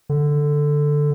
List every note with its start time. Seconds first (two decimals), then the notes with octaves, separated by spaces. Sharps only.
0.09 D3